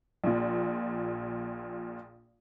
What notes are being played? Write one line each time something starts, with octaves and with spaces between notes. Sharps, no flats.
A#1 A#2